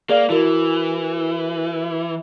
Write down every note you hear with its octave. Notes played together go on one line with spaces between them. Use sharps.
A#3 G#4 D5 F5
E3 E4 F#4 A#4